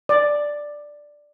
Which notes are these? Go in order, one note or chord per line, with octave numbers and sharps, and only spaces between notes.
D5